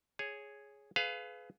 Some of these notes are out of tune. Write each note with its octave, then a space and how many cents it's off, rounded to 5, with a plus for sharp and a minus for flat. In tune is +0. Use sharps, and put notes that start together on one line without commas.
G#4 +0 C#5 +0
G#4 +35 B4 +25 F5 +0